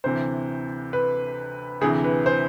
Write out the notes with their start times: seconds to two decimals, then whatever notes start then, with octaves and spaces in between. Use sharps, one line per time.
0.04 D2 C3 E3 C5
0.93 B4
1.81 D2 C3 E3 G#4
2.04 B4
2.26 C5